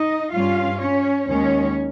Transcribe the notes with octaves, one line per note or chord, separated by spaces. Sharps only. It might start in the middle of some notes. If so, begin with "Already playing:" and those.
Already playing: D#4 D#5
G2 G3 C#4 F4 F5
C#4 C#5
D#2 D#3 G#3 C#4 C#5